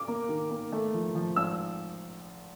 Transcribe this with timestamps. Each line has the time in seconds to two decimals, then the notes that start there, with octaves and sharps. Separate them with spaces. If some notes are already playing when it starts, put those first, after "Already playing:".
Already playing: D6
0.08 A#3
0.29 D#3
0.50 A#3
0.72 A3
0.94 F3
1.15 F3
1.36 G#1 E6